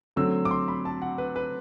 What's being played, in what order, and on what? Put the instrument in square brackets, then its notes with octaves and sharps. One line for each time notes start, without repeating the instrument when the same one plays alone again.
[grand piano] D3 F#3 A3 C4 E6
D6
C6
B5
A5
F#5
B4
B4